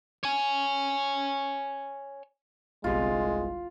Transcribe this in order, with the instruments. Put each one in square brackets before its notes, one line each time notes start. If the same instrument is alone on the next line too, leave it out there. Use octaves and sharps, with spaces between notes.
[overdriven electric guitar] C#5 G#5
[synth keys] G1 C2 [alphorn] G#3 [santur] F4